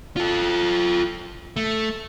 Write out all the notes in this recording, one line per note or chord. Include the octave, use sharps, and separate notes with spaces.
F4 A4
A3